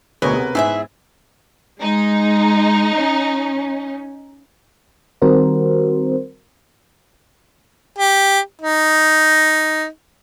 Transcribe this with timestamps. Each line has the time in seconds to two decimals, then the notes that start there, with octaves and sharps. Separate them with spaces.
0.22 D2 B2 G#4 A#4 B4 C#5
0.33 C3 B3
0.55 G#2 E4 G#4 E5
1.80 G#3 D#4
2.95 C#4
5.22 D#3 G3 C4 F#4 A#4 C5
7.98 G4
8.61 D#4